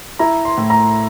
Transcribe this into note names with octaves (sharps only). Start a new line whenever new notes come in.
E4 A#5
C6
A2
A#5